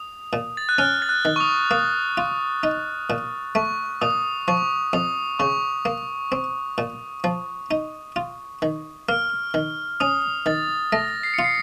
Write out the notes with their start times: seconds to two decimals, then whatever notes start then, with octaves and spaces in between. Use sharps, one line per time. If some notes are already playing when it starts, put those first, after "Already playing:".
Already playing: D#6
0.33 A#2
0.57 A6
0.69 F#6
0.78 C#4 F6
1.02 A6
1.09 F#6
1.25 D#3
1.36 C#6
1.40 D#6
1.71 A#3 D#6
2.17 F4
2.63 D#4
3.10 A#2
3.55 A3 C#6
4.01 A#2 D#6
4.48 F3 C#6
4.93 F2 D#6
5.39 C#3 C#6
5.85 A#3
6.32 C4
6.78 A#2
7.24 F3
7.71 D#4
8.16 F4
8.62 D#3
9.09 A#3 F6
9.54 D#3
10.00 C#4 D#6
10.46 D#3 A6
10.92 A3 A#6
11.23 C7
11.34 F4 C#7
11.44 C7